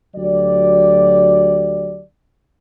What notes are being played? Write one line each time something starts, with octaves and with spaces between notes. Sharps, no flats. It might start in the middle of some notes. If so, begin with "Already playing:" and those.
D2 F#3 G4 D5